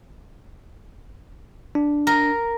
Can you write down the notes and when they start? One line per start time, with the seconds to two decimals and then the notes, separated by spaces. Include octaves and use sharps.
1.75 D4
2.07 A#4